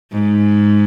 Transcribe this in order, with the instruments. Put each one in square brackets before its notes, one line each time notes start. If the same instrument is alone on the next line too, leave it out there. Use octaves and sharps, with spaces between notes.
[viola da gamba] G#2